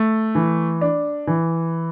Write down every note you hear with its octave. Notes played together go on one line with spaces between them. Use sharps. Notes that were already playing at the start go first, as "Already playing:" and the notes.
Already playing: A3
E3
D4
E3